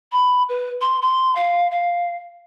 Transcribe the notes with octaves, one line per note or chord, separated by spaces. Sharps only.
B5
B4
C6
C6
F5
F5